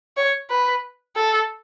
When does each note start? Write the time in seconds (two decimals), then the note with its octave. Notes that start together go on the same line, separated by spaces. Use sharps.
0.17 C#5
0.50 B4
1.16 A4